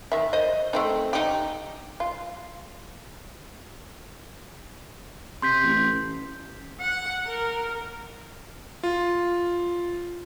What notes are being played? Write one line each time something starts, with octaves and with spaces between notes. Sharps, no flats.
D#3 E5
C5 D#5
A3 C4 D#4
D#4 G4
F4
C3 C6 G6 B6
A1
F#5
A#4
F4